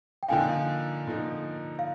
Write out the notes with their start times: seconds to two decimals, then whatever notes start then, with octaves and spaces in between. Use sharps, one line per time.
0.23 G5
0.28 D3 F3 A#3 D#4 F5 G#5
1.07 D3 F3 A#3 D#4
1.79 F5